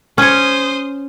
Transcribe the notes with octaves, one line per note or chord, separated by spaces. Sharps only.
C#4 C5 C#5 D#6